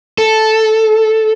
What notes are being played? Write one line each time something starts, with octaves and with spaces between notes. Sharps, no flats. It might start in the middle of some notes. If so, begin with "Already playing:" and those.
A4